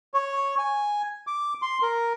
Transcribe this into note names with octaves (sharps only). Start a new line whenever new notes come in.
C#5
G#5
D6
C6
A#4